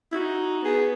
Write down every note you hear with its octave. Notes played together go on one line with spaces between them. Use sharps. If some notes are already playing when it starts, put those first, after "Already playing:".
E4
D#4 F#4
B3 G#4